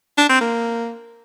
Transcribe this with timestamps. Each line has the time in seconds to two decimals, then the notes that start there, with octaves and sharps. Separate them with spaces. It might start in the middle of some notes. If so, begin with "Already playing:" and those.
0.18 D4
0.29 C4
0.41 A#3